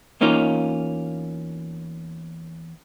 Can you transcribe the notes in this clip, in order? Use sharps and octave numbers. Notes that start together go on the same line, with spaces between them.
E2 A#3 C#4 D#4 F4